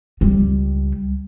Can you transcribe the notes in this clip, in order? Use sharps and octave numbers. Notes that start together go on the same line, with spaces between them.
C#2 G3